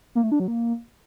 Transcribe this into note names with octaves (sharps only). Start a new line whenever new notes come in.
A#3
A3
D4
F#3
A#3